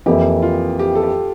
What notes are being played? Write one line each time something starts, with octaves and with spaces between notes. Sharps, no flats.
F2 E3 A#3 E4 G4
F4
G4
A4
G4